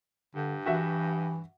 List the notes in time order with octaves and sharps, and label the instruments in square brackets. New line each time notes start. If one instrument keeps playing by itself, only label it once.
[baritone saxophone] G2 [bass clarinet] D3
[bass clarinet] E3 [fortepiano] F#4 E5 F#5